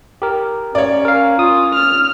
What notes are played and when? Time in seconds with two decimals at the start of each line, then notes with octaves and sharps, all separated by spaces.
0.22 G4 A#4
0.75 C#4 C#5 D5
1.05 A#4 F5
1.39 F4 D#6
1.75 F6